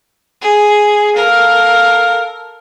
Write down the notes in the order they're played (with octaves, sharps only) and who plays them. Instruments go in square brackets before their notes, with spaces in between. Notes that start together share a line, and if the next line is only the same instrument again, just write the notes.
[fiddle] G#4
[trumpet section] A4 F5 [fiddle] A#4